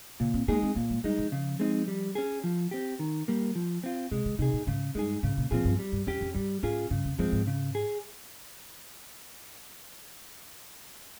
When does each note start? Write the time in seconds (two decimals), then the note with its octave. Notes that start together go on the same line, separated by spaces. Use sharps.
0.20 A#2 C#3
0.34 C4
0.48 G#3 A#3 D#4 G#4
0.62 C4
0.76 A#2 A#3
0.90 G#3
1.04 G3 G#3 D#4
1.18 F3
1.32 C#3
1.60 G#3 C4 D#4
1.88 G3
2.15 C#4 G#4
2.44 F3
2.71 C4 G4
2.99 D#3
3.28 G3 A#3
3.55 F3
3.83 C4 F4
4.11 C3 G#3
4.26 C#3
4.39 C3 D#4 G#4
4.53 A#2
4.67 G#2 C#3
4.95 G2 G#3 D#4 G#4
5.23 G#2 C#3
5.37 A#2
5.51 A#2 F3 C4 F4 G#4
5.65 G2
5.79 G3
5.92 G2
6.07 F2 C#4 G4
6.21 F2
6.34 G2 G3
6.63 G#2 C#4 F4 G#4
6.90 G2 C#3
7.05 F2
7.18 G2 F3 G#3 C4
7.32 G#2
7.47 C#3
7.75 G#4